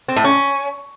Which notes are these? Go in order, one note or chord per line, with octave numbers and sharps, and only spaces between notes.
C4
A2
C#4